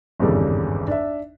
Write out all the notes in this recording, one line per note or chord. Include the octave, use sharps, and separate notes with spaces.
G#1 E2 G2 C#3 G3 A4
D4 E5